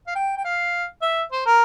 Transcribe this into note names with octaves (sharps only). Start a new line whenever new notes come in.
F5
G5
G5
F5
E5
C5
A#4